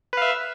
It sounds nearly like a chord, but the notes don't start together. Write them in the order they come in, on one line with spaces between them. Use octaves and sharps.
B4 F5 E5